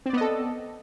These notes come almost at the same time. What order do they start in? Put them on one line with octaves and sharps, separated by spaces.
C4 D5 B3 D#5 A4